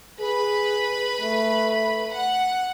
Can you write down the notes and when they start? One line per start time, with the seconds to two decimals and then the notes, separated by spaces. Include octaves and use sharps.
0.20 G#4 B4 B5
1.21 A3
2.12 F#5